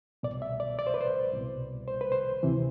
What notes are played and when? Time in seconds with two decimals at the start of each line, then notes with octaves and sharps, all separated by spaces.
0.23 C2 B2 D5
0.42 E5
0.60 D5
0.79 D5
0.87 C5
0.94 B4
1.00 C5
1.34 C2 B2
1.88 C5
2.01 B4
2.12 C5
2.43 D2 C3 E3